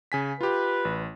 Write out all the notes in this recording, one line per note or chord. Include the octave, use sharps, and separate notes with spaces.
C#3 G#5 B6
F4 G4 B4
A1